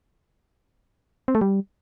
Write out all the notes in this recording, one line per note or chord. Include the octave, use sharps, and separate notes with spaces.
C4
A3
G3